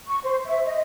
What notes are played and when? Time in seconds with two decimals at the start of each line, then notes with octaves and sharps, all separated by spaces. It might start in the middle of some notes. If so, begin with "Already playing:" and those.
0.07 C#6
0.24 C5
0.47 E5
0.66 D#5